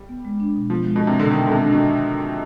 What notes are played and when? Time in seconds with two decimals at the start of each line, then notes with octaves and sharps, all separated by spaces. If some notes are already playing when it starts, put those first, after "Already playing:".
Already playing: G3
0.09 B3
0.25 G#3
0.40 D4
0.56 B2
0.70 F3 B3
0.85 G#3
0.96 B2
1.02 D4
1.07 C3
1.16 B2 D3
1.31 D#3 B3
1.46 D3 G#3
1.52 C3
1.63 D4
1.72 B2